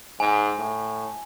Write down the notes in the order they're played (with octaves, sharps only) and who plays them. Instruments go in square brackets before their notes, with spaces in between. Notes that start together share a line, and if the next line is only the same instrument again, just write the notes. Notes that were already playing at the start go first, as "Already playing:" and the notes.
[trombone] G#2 [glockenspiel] G#5
[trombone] A2